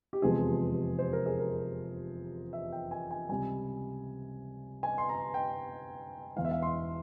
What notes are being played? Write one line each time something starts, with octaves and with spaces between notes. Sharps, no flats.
G4
F1 E2 C3 F3 G#3 G#4
C5
A#4
G#4
A#4
E5
G5
G#5
G#5
C#2 C3 G3 G#5
G#5
C6
A#5
G5
E1 E2 E3 F5
E5
F5
C6